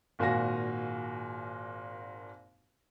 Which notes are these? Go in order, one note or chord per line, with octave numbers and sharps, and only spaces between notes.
G#1 A#2 F#4 F5 G#5 A#6